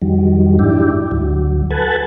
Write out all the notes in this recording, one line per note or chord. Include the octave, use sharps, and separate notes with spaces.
F2 D#3 F#3 G3
G#2 D4 E4 G4
D2 F#3
A4 B4 F#5 G#5 A5